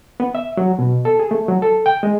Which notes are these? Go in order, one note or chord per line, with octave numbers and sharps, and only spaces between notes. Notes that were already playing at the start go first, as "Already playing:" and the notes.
B3
E5
F#3
B2
A4
G#4
A3
F#3
A4
G5
G#3